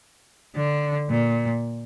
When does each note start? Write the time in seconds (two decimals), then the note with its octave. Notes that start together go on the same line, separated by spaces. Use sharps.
0.57 D3
1.10 A#2